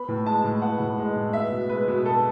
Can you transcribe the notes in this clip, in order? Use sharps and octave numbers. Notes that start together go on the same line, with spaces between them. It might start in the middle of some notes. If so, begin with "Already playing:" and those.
Already playing: B3 B5
A2
G#3 A5
A2
B3 F#5
A2
G#3
A2
B3 E5
B2
G#3 B4
B2
B3 A4